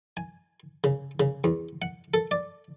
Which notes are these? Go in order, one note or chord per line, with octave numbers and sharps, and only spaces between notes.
G#5
C#3
C#3
E2
F#5
A4
D5